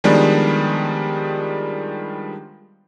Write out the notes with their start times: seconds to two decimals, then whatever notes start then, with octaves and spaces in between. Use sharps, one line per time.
0.04 D#3 F3 G3 G#3 B3 D4